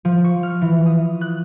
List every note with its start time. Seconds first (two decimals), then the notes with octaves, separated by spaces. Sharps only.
0.05 F3
0.24 C#6
0.43 F6
0.61 E3
0.86 D#6
1.21 F#6